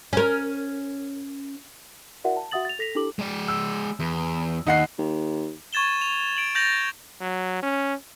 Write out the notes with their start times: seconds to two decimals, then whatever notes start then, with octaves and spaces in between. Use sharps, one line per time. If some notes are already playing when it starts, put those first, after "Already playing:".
0.13 C#4 A#4
2.24 E4 F#4 A#4 D5 E5 F#5
2.37 A5
2.51 F#4 E5 F#5 D#6 A6 F#7
2.65 A6 F7
2.79 A4 A#6 B6 F7
2.95 D4 E4 G4 A4 D6 F#7
3.19 G#3 D5
3.48 E6
4.00 E2
4.66 D#2 D#4 F#5 C7
4.98 D#2
5.73 C#6 G#6 A6 E7 G7
6.02 F7
6.37 D7 F#7
6.55 G6 A6 A#6 F7 F#7
7.21 F#3
7.63 C#4